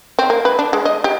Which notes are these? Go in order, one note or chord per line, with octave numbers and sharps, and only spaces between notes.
C4
A#3
B4
D4
G#3
D#5
G4